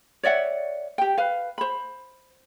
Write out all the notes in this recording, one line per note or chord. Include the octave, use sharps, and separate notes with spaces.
C#5 D5 E5 F#5
G4 G5
B4 F5
C5 B5